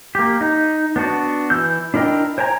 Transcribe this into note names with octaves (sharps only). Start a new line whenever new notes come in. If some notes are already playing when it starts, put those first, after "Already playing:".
A#3 G4
D#4
B3 D4 F#4
E3 E6 G6
D4 E4 A#4 D#5 G5
C5 G5 G#5 A#5